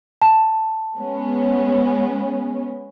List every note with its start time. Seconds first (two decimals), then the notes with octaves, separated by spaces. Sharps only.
0.22 A5
0.97 G#3 B3 C#4